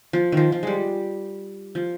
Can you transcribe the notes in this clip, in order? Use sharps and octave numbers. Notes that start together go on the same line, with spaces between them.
F3
D#3 F3
F3
G3 G#3
F3